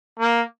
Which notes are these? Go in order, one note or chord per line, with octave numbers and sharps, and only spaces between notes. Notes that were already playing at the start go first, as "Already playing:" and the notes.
A#3